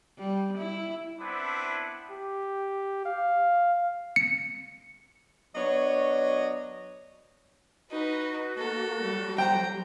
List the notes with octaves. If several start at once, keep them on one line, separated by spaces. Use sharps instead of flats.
G3
E4
B3 C4 D4 E4
G4
F5
C#7
F#3 B3 D4 C#5 D#5
D#4 F#4 B4
A#3 A4
F#3 G3
C5 G5 A#5